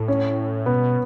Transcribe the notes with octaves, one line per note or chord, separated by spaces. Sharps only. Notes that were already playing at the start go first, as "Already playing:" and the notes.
Already playing: A2
C#4
B2 B3